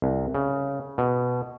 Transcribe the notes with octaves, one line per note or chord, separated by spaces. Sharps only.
C2
C#3
B2